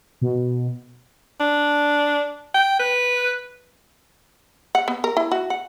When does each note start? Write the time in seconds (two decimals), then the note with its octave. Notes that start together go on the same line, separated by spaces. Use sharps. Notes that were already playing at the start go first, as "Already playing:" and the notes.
0.22 B2
1.40 D4
2.54 G5
2.79 B4
4.75 F#5
4.88 B3
5.04 A#4
5.17 E4
5.32 F#4
5.50 F#5